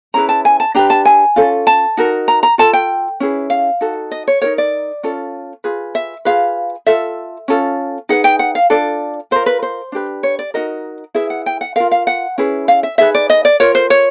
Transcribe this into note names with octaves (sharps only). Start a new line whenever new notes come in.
C#4 E4 G#4 B4 A#5
A5
G#5
A5
D4 G4 B4 A#5
A5
G#5
C#4 F4 A4
A5
D#4 F#4 A#4
A#5
A#5
F4 A4 A5
G5
C#4 E4 G#4 B4
F5
D#4 F#4 A4
D#5
C#5
D#4 F#4 A#4 C#5
D5
C#4 F4 A4
F4 G#4 B4
E5
F4 G#4 B4 F5
F4 A4 E5
C#4 F4 A4
D#4 G#4 B4 F#5
G5
F#5
F5
D4 F4 A4 D5
F4 A#4 C5
B4
C5
D4 G4 B4
C#5
D5
D#4 F#4 A#4 D#5
E4 G#4 B4 E5
F#5
G5
F#5
F4 A#4 F5
F5
F#5
C#4 E4 G#4 B4
F5
E5
D#4 G#4 B4 E5
D5
D#5
D5
F4 A#4 C#5
C5
C#5